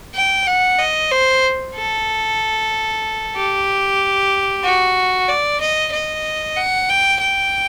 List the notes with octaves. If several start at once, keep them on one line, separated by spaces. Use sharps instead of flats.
G5
F#5
D#5
C5
A4
G4
F#4
D5
D#5
D#5
F#5
G5
G5